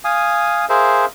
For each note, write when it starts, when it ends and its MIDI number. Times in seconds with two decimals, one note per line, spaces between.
0.04 0.65 77
0.04 0.65 80
0.04 0.65 87
0.69 1.05 68
0.69 1.05 70
0.69 1.05 72
0.69 1.05 76
0.69 1.05 77